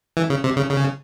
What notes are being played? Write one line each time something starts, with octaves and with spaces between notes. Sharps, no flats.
E3
C#3
C3
C#3
C#3